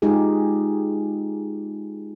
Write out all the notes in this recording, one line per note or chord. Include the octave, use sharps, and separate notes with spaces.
G#3 D#4 F4 G4 G#4